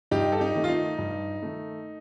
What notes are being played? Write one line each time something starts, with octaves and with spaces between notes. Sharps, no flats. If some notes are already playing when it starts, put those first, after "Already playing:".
G2 D#4 G4
A4
D#4 G4
D#3 A3
F4
D#4
G2
D#3 A3